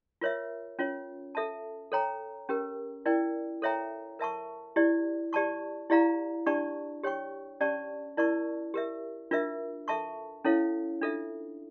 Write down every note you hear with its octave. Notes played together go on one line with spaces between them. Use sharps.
F4 A#4 C#5 E5
C#4 F4 C#5
A4 E5 A5
A4 C#5 G5 A#5
C#4 G4 A#4
E4 A#4 D5 G5
A4 C#5 E5 G5 A#5
A#4 E5 A5 C#6
E4 G4 D5
G4 D5 A5 C#6
E4 G4 D5 F5 A#5
D4 G4 D5 A5 C#6
G4 C#5 G5 C#6
C#4 G4 D5 A5 C#6
E4 A#4 D5 A5 C#6
G4 A#4 E5
D4 F4 A#4 E5
A4 E5 A5 C#6
C#4 E4 A4 C#5 F5
D4 F4 A4 E5